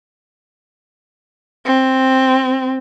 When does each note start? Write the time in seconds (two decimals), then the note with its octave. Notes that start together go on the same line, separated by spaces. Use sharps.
1.65 C4